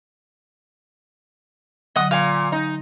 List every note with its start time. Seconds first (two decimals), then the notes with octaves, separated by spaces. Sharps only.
1.96 D3 F#3 D#5 F#5 D#6
2.11 A#2 F5 G#5
2.52 D#4